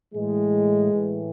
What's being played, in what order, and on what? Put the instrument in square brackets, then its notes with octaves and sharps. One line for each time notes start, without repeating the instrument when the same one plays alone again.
[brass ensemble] A2 E3 G#3
A2 E3